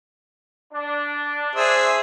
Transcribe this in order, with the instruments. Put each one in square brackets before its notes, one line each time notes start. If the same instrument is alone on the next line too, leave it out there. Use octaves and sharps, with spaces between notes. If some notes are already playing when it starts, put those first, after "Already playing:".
[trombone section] D4
[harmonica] G#4 C5 E5